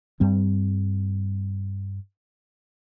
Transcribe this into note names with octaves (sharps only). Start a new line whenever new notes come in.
G2 G3 C4